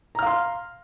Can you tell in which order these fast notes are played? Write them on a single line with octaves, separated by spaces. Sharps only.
A#5 F6 F5 C6